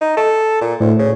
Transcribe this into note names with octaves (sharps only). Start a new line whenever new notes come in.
D#4
A4
A#2
D2 A2
C#3